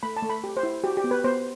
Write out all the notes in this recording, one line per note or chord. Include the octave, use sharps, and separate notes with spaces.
A3 B5
A5
A3
B5
G4
C5
E4
F#4 G4
G4
B3
B4
B3 C5